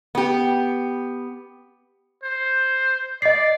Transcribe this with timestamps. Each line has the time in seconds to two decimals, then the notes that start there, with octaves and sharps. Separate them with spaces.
0.15 B3 G4
2.23 C5
3.22 D5 D#5 C7